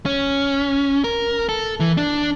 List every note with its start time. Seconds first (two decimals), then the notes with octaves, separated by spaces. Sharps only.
0.06 C#4
1.04 A#4
1.49 A4
1.80 E3
1.97 D4